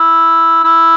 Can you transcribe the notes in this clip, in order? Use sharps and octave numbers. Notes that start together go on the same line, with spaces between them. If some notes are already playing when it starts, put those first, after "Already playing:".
Already playing: E4
E4